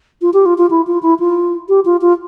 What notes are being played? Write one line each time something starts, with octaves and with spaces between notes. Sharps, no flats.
F4
G4
F4
F4
E4
F4
E4
F4
G4
F4
F4